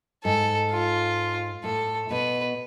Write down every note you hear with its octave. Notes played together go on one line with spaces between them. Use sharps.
G#2 A4
F4
A2 A4
B2 B4